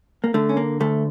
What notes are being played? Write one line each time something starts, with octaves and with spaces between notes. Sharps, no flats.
A#3
D3 A3
C#4
A#3
D2 A3